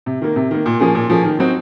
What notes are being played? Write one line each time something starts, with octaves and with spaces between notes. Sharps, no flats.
C3
D#3 A#3
C3
D#3 A#3
A#2
F3 A#3 C#4 G#4
A#2
F3 A#3 C#4 G#4
D#3
F#3 C4 D#4 F#4